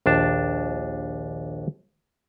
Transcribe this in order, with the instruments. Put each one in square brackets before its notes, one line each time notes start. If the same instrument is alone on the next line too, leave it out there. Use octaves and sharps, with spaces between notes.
[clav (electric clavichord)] A#1 D#2 D4 A5